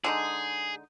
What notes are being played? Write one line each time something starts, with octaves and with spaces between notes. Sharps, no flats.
D3 G#3 D#4 G#4